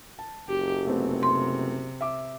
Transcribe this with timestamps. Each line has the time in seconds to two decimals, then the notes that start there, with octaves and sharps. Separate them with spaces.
0.19 A5
0.49 F#1 G4
0.87 C3 A3 B3 C4
1.23 C6
2.01 E5 D6